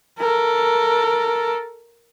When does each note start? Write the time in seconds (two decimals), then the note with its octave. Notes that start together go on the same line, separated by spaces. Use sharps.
0.18 A4 A#4